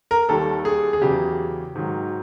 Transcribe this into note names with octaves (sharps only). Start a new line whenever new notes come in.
A#4
D#2 D#3 G3 A4
G#4
G#4
E2 C#3 F#3 G4
G#2 D#3 F#3